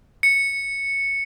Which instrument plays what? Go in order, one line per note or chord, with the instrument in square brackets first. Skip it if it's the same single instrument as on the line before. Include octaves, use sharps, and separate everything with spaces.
[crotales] C#7